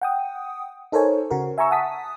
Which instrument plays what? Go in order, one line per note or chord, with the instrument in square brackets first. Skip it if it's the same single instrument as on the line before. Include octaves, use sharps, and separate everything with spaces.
[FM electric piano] F#5 G5 D#6
D#4 A4 A#4 C5 C#5 G#5
C#3 F#4 A#4
E5 G#5 A#5 C#6 E6
F#5 A5 D#6 B6